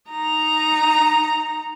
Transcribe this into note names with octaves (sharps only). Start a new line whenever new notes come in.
D#4 A#5